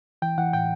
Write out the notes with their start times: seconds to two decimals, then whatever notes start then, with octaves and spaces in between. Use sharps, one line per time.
0.22 E3 G5
0.38 E3 F#5
0.53 A2 G5